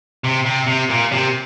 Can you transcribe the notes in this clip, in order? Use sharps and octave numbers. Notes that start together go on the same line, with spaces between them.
C3
C3
C3
A#2
C3